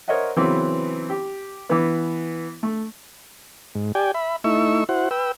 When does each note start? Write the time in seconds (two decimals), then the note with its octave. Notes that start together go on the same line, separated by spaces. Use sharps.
0.08 A#4 C5 C#5 D#5 E5 F#5
0.36 C#3 E3 F#3 B3 C4
1.09 G4
1.69 E3 B3
2.63 A3
3.75 G#2
3.95 G4 D5 G5 G#5
4.14 E5 B5
4.44 A3 D#4 E4 C#6 E6
4.89 E4 F#4 C5 F#5
5.11 B4 G5 E6